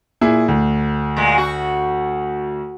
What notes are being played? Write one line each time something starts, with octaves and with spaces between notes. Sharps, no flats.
A#2 E4 G#4
D2
A#2 G#3
F#4